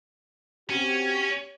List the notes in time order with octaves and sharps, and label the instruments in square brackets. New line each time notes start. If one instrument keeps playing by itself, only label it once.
[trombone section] C4 F#4 G4 [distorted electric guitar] C#4